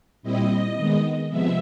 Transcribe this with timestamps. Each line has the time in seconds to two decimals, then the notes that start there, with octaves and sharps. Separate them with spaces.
0.23 A#2 G3 C4 E4 D#5
0.76 D#3 G#3 B3
1.29 C3 F3 G#3 B3 E5